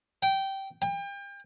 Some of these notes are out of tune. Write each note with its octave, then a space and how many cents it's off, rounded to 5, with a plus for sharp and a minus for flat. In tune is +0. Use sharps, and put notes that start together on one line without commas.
G5 -15
G5 +35